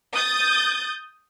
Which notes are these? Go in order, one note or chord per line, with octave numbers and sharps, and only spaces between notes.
D#6 G6 A6